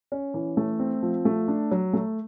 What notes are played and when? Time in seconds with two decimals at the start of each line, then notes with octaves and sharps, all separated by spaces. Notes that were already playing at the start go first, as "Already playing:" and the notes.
0.12 C#4
0.34 E3
0.57 A3
0.79 C4
1.03 F3
1.25 A3
1.48 D4
1.71 F#3
1.93 A3